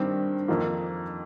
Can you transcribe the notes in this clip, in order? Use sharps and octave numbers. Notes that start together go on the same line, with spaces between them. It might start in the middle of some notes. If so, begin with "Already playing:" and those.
Already playing: G2 D#3 G3 C4
F2 D#3 A#3